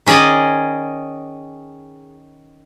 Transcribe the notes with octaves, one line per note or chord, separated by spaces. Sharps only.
D#3 C#4 G#4 D5 D#5